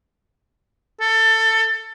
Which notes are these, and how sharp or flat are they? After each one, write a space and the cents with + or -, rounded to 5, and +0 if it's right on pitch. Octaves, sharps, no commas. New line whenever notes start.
A4 +20